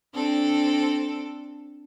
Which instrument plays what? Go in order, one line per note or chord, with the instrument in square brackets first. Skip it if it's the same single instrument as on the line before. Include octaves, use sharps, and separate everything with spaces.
[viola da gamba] C4 D4 A4